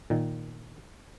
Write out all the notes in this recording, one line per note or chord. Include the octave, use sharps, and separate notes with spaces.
A#2 D#3